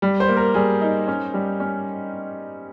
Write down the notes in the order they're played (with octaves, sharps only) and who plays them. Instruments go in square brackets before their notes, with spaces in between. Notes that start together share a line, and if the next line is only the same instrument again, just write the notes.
[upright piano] G3
[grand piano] C5
[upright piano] A#3
[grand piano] A#4
[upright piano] G3 [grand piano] G#4
[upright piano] D#4
C#4
G3
C#4